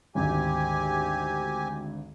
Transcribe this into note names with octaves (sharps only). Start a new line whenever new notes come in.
G#1 D2 G#2 C4 G4 G#5